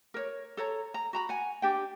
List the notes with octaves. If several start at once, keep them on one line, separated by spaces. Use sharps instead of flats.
A#4 C#5
A4 C#5 A#5
A#5
F#4 A#5 B5
F#5 G#5
D4 G4 G5